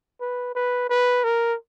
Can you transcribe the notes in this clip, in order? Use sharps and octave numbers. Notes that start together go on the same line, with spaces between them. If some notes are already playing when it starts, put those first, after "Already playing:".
B4
B4
B4
A#4